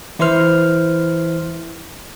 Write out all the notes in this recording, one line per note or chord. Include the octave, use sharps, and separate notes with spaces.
E3 E4 B4 C5 C6 F6